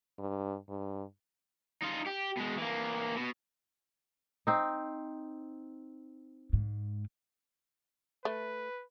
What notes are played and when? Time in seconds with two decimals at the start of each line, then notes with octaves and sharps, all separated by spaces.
0.19 G2
0.69 G2
1.82 D#4 F4
2.07 G4
2.37 B2 G#3
2.58 E3 A#3
3.16 B2
4.47 C4 D#4
6.53 G#2
8.25 A3 B4